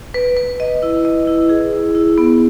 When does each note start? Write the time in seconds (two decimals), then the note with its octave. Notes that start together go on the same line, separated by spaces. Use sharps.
0.14 B4
0.37 B4
0.60 D#5
0.83 E4
1.05 D#5
1.27 E4
1.49 G#4
1.73 E4
1.95 E4
2.18 B3